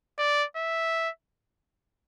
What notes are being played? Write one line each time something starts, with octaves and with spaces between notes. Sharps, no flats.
D5
E5